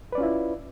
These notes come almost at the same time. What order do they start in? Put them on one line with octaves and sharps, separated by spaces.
B4 D5 C#4 F4 E4